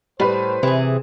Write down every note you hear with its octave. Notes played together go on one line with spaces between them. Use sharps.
A2 G3 B4 C5
C3 E3 G#4